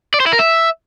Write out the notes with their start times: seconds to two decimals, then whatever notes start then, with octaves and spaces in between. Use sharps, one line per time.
0.14 D5
0.20 C5
0.26 E4
0.33 A#4
0.39 E5